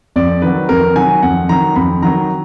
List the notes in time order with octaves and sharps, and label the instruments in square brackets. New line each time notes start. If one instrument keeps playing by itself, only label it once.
[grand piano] F2 D5
D#3 F#3 B4
F2 A#4
D#3 F#3 G#5
F2 F#5
D#3 F#3 A#5
F2 B5
D#3 F#3 A#5